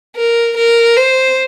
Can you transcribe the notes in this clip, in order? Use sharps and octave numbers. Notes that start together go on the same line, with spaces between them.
A#4
A#4
C5